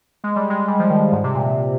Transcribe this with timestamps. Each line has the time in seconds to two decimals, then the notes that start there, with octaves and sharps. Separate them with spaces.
0.24 G#3
0.36 G3
0.50 G#3
0.68 G3
0.80 F3
0.90 D#3
1.12 G#2
1.24 C3
1.35 A#2